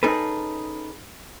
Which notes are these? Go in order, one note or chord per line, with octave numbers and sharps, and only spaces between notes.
C#4 D#4 G#4 A4 B4